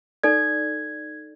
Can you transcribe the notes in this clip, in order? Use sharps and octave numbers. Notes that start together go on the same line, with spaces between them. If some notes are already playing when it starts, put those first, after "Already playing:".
D#4 A4 D5 G#6